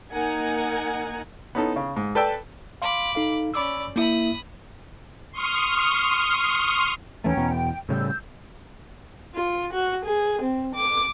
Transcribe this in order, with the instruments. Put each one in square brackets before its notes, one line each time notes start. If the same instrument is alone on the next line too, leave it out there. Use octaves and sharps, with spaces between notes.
[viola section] A#3 D#4 A#4 F#5 G#5
[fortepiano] B3 C#4 D#4 E4 A4
C#3
G#2
A4 B4 D5 G5 A5 E6
[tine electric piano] F5 C6 [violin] B5 D6
[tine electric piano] D#4 A4 F5
[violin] C#4 D5 [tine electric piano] B5 D6 E6
[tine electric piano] A#3 E4 E5 [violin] B5 D#6
[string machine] C6 C#6 D#6 F6
[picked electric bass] D#2 E3 A3 [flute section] C#4 G5 A#5
[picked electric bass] E2 B2 B3
[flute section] G5
[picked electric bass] A2 C#3 G3 [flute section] E6 G6
[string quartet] F4
F#4
G#4
C4
D6